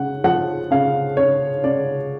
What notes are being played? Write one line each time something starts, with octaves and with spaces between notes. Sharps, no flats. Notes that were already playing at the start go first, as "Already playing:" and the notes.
Already playing: C#3 F#5
F3 F#5
C#3 F5
C#3 C#5
C#3 D5